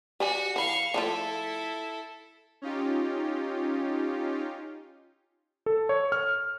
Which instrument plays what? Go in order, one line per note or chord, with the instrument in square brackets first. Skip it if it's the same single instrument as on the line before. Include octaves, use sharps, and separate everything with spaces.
[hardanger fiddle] F#4 [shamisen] G4 D5 G#5
[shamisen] E3 B5 [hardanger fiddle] F5 C#6
[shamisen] F3 A3 F4 [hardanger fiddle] E4 A4
[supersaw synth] C#4 D#4 F4 G4
[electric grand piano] A4
C#5
F6